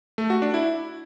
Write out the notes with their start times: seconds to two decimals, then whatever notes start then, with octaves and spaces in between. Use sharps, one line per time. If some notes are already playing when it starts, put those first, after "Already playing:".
0.18 A3
0.30 F#4
0.42 D4
0.54 E4